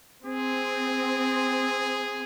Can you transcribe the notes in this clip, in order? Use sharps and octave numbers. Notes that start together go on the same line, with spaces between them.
C4 G#4